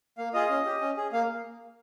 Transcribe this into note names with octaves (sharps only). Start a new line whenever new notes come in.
A#3 F5
F4 G#4 D#5
C#4
G4
C#4
G#4
A#3 F5